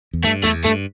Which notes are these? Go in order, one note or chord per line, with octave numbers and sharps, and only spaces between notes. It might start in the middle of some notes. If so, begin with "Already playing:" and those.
E2
G2 A3
E2 A3
G2 A3